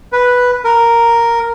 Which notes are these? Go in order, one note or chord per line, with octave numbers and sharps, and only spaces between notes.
B4
A#4